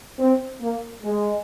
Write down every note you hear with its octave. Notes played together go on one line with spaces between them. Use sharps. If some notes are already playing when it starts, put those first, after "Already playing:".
C4
A#3
G#3